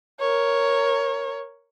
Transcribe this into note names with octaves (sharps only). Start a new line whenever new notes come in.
A#4 C#5